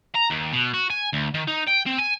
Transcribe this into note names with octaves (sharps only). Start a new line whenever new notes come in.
A#5
D#2
B2
F#4
G#5
D2
D#3
D#4
G5
C4
G#5